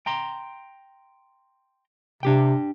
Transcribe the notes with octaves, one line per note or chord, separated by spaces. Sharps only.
G5 A#5 C6
C3 D4 G4 G5